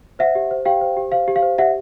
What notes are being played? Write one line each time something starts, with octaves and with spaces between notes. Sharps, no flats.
C5 E5 F#5
G4
C5
G4 F5 G5
C5
G4
C5 F5
G4
F5
C5
G4 E5 F#5